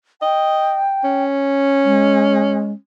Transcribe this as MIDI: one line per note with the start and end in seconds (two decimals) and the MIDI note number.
0.22 0.84 75
0.22 1.24 79
1.04 2.76 61
1.84 2.71 56